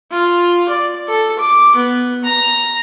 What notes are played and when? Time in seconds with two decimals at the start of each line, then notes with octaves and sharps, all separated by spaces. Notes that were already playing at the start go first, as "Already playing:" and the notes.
0.11 F4
0.69 D5
1.08 A4
1.39 D6
1.76 B3
2.24 A#5